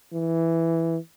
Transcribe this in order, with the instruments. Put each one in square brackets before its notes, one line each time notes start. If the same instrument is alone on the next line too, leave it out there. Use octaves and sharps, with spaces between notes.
[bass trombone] E3